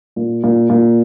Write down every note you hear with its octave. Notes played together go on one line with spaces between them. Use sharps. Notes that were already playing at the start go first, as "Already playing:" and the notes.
A#2
A#2
A#2